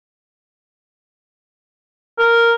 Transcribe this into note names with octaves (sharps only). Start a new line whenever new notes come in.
A#4